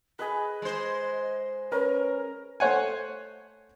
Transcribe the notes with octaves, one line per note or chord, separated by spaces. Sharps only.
G#4 B4 D#5
G#3 C5
C#4 A#4 B4 C#5
A3 C5 C#5 F#5 G#5